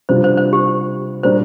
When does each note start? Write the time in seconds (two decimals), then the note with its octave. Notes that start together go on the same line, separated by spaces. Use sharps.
0.09 C3 G3 D4 F4 C5
0.24 C5
0.37 C5
0.53 G4
1.23 A#2 G3 D4 A#4 C5